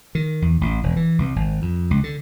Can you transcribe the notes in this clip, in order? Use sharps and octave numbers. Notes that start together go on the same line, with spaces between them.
D#3
E2
A1
E1
E3
C2
G#1
F2
C#2
D3